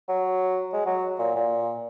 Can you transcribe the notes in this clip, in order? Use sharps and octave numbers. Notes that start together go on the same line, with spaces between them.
F#3
G#3
F#3
A#2
A#2